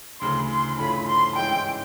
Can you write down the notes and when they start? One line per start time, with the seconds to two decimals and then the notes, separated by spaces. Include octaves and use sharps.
0.21 D2 C#3 E3 C6
0.50 C6
0.78 G2 E3 A3 C#4 F4 B5
1.08 C6
1.36 G#2 E3 G#3 C#4 E4 G5